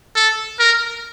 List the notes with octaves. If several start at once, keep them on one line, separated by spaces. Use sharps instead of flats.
A4
A#4